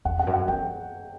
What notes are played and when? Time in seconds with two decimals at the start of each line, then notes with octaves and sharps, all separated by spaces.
0.05 E2 F#5
0.19 F#5
0.27 F#2
0.34 F#5
0.48 E3 G5